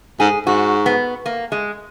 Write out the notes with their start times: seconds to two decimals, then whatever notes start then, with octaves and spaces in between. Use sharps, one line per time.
0.20 G#2 G#4
0.46 G#2 F#4
0.86 B3
1.26 A#3
1.52 G#3